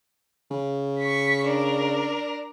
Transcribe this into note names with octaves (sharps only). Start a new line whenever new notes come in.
C#3
C#6 B6
D4 A#4